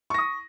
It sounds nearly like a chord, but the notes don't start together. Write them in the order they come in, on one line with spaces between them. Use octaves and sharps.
C#6 A#6 D#6